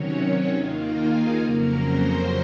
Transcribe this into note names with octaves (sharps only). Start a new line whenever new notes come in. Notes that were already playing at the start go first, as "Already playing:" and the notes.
Already playing: C3 D#3 F#3 C#4 C#5
C#4 C#5
D#2 D#3 A#3 D#4 F4 F5
G#4 G#5
F2 C#3 F#3 A#3 C#4 A#4 A#5
C5 C6